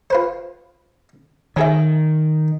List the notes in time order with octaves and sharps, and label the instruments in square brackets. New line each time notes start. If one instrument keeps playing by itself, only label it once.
[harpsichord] F4 B4 C5
[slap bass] D#3 [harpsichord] F#3 G#4 E5